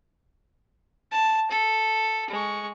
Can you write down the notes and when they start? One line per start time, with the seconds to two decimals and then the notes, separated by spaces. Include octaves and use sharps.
1.12 A5
1.51 A4
2.30 G#3 C#6